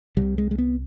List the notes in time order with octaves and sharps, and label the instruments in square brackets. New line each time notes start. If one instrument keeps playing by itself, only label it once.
[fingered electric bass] C2 C3 G3
G#3
G#3
B3